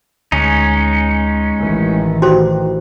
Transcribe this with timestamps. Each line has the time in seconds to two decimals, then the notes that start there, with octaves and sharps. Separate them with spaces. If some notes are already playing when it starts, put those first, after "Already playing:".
0.32 D2 G#3 C#4 D#4
1.59 A1 D#3 E3
2.22 F#4 G4 C5